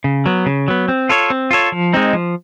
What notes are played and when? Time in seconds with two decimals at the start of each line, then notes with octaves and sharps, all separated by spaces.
0.04 C#3
0.26 F#3 B3
0.46 C#3
0.68 F#3 B3
0.88 C4
1.09 F4 A4 C#5
1.30 C4
1.51 F4 A4 C#5
1.72 F3
1.93 G#3 C4 D#4
2.13 F3